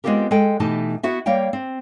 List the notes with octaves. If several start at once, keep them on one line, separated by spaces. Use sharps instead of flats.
G#3 B3 C4 F4 G4 A#4
G#3 A4 G5
B2 E3 A3 D#4 G4 A5
B3 E4 F#4 E5
G3 A#3 C#5 F5 G5
C4